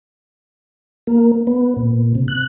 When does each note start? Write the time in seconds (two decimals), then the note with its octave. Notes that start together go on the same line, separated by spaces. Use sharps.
1.07 A#3
1.47 B3
1.77 A#2
2.15 C3
2.28 F#6